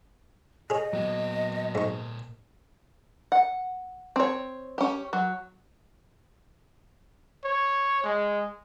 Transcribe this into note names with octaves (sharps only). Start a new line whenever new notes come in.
G#4 C#5 D#5
A#2 F#3 B3 G5
G#2 C#6
F#5
C4 C#5
C#4 G4
F#3
C#5
G#3